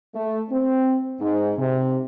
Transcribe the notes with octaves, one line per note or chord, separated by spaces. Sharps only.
A3
C4
G#2
C3